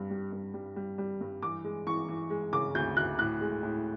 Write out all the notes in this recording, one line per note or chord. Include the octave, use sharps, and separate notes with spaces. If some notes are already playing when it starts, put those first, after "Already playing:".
Already playing: G2 G3
G3
G2
G3
G3
G3
G2
E3 D6
G#3
E3 C#6
E3
G#3
C#3 D6
D2 G6
D2 F#6
A2 F#6
G#3
A2